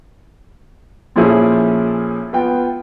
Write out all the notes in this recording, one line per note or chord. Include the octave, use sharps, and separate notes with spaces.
A#2 F3 C#4 E4 G#4 A4
B3 F4 G5